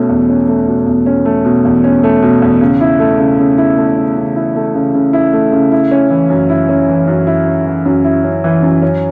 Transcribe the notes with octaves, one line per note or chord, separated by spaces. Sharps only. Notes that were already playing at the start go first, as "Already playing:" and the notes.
Already playing: B2 A3 C#4
E2
C#4
A3
B2
E2
C#4
A3
B2
E2
C#4
A3
B2
E2
C#3
E4
A3
C#3
C#3
E4
A3
C#3
C#3
E4
A3
C#3
C#3
E4
A3
C#3
E4
C#4
E3
F#2
E4
C#4
E3
F#2
E4
C#4
E3
F#2
E4
C#4
E3
F#2
C#4